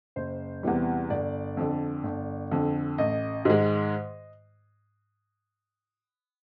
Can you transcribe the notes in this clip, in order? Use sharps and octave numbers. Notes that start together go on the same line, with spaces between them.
F#1 C5
E2 C3 E3 G3
G1 D5
F2 D3
G1
F2 D3
A1 D#5
G#2 D#3 G#3